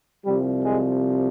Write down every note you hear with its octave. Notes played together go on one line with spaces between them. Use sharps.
C2 C3 F3 G3
G#3